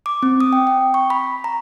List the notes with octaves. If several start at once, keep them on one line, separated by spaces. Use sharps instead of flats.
D6
C4
D#6
G5
G5
C#6
B5
A#5